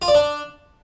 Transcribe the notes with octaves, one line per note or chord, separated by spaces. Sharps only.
F4
D5
D4